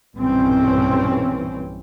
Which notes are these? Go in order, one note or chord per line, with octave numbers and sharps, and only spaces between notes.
B1 G2 A#2 E3 C4 C#4